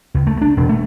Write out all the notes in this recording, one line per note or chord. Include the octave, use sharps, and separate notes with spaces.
C#2
A3
D4
E1
A3